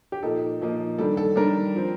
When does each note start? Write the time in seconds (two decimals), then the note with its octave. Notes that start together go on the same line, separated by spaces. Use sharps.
0.12 G4
0.23 A#2 F3 A#3 D#4 A4
0.61 A#2 F3 A#3 D#4
0.98 D#3 G3 D4 A4
1.17 A4
1.36 D#3 G3 D4 A#4
1.76 F3 C4